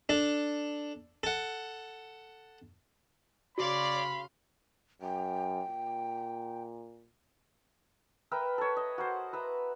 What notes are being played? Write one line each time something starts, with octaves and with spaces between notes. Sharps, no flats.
D4 A4
A4 F#5
C#3 F#4 C#5 D5 F5 B5 C6
F#2 G5
A#2
A#4 B4 E5 G5
A4 C#5
D#5
F#4 A#4 C5
B4 E5 A#5